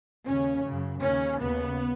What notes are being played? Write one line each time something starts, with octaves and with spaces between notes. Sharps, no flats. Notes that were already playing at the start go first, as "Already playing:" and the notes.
D#2 C#3 C#4
F#2 C#3
D#2 C#3 C#4
D#2 C#3 B3